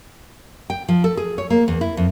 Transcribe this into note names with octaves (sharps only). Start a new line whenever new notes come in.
G5
F3
A4
G#4
C#5
A#3
E2
E4
F2